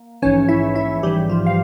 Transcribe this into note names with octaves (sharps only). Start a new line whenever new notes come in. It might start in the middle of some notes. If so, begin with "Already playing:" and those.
Already playing: A#3
A#1 G#2 E3 C#4 C#5
E4 E5
E4 E5
A#1 G#2 E3 G3 G4
F3 F4
F5